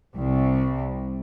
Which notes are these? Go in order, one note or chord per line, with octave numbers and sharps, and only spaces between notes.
C2